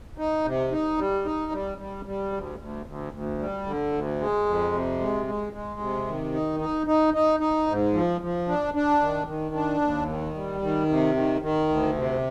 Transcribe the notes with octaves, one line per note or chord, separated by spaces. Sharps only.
D#4
C3
D#4
G3
D#4
G3
G3
G3
D2
D2
D2
D2
G3
D3
D2
G#3
F2
C3
G#3
G#3
G#3
C3
D#3
D#4
D#4
D#4
D#4
D#4
G#2
F3
F3
D4
D4
D#3
D#3
D4
D#2
D#3
G3
D#3
C3
D#3
D#3
D2
C3